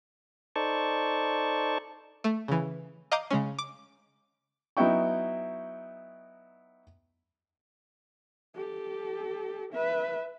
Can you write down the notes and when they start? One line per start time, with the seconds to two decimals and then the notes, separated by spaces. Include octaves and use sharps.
0.56 D#4 A4 C5 D5 A5 C#6
2.24 A3
2.48 C#3 E3
3.12 D#5 F5 A#5 D6 G6 D#7
3.30 C#3 G#3 C#4
3.59 D6
4.77 F#3 B3 D#4 E4 G5 C#6
8.56 G4 A4
9.73 B4 E5